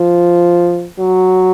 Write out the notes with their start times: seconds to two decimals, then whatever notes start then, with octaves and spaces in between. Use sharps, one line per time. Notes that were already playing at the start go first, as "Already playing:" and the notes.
Already playing: F3
0.99 F#3